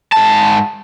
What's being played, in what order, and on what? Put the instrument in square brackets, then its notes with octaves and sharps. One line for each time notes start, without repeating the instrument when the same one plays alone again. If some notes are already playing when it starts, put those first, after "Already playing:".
[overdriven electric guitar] G#2 A5